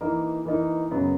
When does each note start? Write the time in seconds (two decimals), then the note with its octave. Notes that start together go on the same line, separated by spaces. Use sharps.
0.01 E3 A#3 D#4 A#4
0.46 E3 A#3 D#4 A#4
0.91 F#2 C#3 F#3 B3